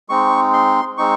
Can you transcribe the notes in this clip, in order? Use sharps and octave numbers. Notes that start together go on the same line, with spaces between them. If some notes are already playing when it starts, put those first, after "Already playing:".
G#3 C4 D#4 C#6
C6
G#3 C4 D#4 C#6